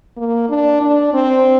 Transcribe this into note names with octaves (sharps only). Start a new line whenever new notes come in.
A#3
D4
D4
C4